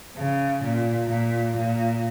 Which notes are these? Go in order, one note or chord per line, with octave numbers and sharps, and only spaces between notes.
C#3
A#2
A#2
A#2